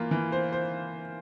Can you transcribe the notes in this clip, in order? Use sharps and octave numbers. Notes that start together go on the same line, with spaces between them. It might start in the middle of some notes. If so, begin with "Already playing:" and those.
Already playing: E3 A#3 F4
E3
C5
C5